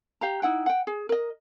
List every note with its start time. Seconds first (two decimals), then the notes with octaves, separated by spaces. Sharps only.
0.21 G4 F5 A#5
0.42 D#4 E4 F#5 G5
0.66 F#5 G5
0.87 G#4
1.09 A#4 D#5